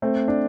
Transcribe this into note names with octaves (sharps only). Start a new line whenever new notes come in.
A3 C4
D4